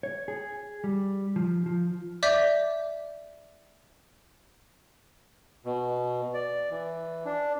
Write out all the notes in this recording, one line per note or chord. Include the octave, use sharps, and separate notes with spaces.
C#5
G#4
G3
F3
F3
D5 E5 D6 G6 B6
B2
D5
E3
D4